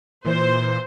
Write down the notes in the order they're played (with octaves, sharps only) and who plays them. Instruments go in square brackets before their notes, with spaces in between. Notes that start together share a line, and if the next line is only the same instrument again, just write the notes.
[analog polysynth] A#2 E3 [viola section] C5